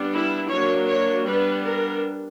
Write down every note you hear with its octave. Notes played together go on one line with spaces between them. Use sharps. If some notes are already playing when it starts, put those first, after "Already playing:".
Already playing: G3 B3 D4
E4
F#3 A#3 D4 C#5
C#5
G3 B3 D4 B4
A#4